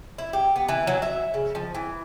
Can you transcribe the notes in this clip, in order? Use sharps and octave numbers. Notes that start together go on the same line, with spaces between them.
E4
G4
B3
E3
F#3
E5
C#3
F3
E3